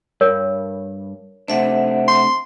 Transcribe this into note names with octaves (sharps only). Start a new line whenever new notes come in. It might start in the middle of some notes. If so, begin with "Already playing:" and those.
G2 A#4 C#5
C3 A3 D4 C5 E5 F#5
C6